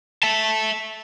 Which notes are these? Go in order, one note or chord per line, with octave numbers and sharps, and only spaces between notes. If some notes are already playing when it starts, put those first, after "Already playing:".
E5 A5